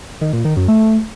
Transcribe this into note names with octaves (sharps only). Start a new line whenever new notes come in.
D#3
A#2
D#3
F#2
A3